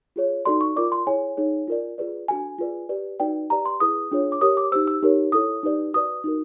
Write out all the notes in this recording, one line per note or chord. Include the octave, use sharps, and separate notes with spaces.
F4 G#4 C#5
D#4 F#4 A4 D5 C6
C#6
F4 A#4 D5 D6
C6
E4 G#4 C#5 G#5
D#4 G#4 C#5
F4 A#4 D5
F4 G#4 B4 D5
D4 F#4 A4 G#5
F4 G#4 B4 D5
G4 B4 D5
D#4 F#4 B4 D5 G5
G4 B4 D5 A#5
C6
E4 G#4 B4 D#6
D4 F4 G#4 C#5
D6
G4 A#4 C#5 D#6
D6
D#4 G4 C5 E6
E6
D#4 G4 A#4 C#5
E4 A4 C#5 D#6
D#4 G4 B4 D5
F#4 B4 D5 D#6
D#4 F#4 A#4